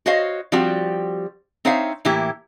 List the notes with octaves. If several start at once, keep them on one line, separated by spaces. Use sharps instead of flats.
F#4 C5 C#5 D#5 F5
F3 G3 C4 F#4 G4
C4 D#4 C5 C#5 E5 F5
A2 E3 A#3 E4 G4